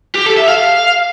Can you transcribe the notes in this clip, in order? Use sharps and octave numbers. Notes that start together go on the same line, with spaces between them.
G4
A4
E5
F5